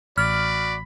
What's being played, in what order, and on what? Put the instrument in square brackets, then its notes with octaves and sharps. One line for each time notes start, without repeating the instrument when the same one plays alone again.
[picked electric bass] A1 [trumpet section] F#4 D5 [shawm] B5 [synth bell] F6